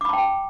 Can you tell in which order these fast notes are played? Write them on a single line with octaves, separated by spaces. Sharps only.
D6 B5 A5 G5